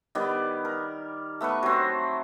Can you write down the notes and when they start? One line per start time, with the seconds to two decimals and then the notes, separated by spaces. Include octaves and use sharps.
0.15 D#3 G3 B3 D5
0.65 A#4
1.41 A3 B3 B4 C#6
1.63 F#3 C4